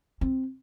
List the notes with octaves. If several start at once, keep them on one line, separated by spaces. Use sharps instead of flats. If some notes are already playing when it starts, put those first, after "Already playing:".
C4